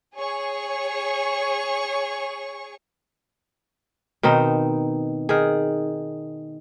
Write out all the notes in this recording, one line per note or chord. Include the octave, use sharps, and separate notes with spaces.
G#4 C#5 C#6
B2 D#3 C4 D#4
D#3 G#4